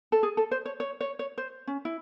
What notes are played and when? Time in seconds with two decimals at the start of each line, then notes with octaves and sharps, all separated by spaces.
0.12 A4
0.23 G#4
0.37 A4
0.51 C5
0.65 C#5
0.80 C#5
1.01 C#5
1.19 C#5
1.38 C5
1.67 C#4
1.85 E4